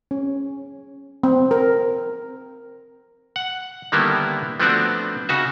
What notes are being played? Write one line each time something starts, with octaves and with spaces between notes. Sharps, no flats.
C#4
C4
A#4
F#5
D3 D#3 G3 A#3 B3 E4
F3 A3 B3 C4 D4 F#4
C#3 D#4 F#4 E5